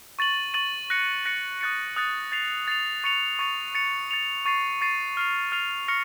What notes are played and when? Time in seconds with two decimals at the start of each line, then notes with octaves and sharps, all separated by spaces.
0.19 C#6 A6 D#7 F#7
0.54 C#6 A6 D#7 F#7
0.90 F#6 A#6 C#7
1.25 F#6 A#6 C#7
1.61 D#6 F#6 A6 C#7
1.96 D#6 F#6 A6 C#7
2.32 A6 C7 F7
2.68 A6 C7 F7
3.04 C#6 A6 C#7 F7
3.39 C#6 A6 C#7 F7
3.75 A6 C#7 F7
4.11 A6 C#7 F7
4.46 C#6 A6 C7 D#7
4.81 C#6 A6 C7 D#7
5.17 F6 C7 F7
5.52 F6 C7 F7
5.88 C#6 F6 A#6 C#7